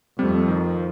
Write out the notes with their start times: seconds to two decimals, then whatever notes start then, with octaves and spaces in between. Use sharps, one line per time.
0.19 F2 G3 A3 C4
0.48 D#3